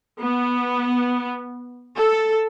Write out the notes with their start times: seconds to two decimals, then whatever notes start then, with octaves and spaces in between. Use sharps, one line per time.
0.20 B3
1.96 A4